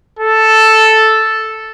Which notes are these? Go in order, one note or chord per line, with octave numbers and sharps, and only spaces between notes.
A4